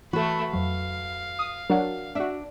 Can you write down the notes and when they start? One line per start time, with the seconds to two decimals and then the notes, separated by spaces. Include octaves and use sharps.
0.13 E3 A3 B3 F#4 A4 B5
0.54 F2 F#3 F5
1.39 D#6
1.70 F#3 D4 A#4 F#5
2.15 D4 F#4 E5